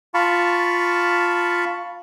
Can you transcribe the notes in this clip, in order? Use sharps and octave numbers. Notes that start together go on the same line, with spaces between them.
F4 F5 A5 B5 C#6